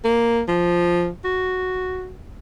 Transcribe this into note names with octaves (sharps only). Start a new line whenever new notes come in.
A#3
F3
F#4